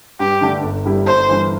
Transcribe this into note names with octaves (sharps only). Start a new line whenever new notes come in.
G2 G4
D3 A3 D4
G1
G2 G3 E4 G4
G1 C5
G2 E3